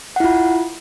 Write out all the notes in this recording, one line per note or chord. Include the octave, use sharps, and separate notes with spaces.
E4 F4 F#5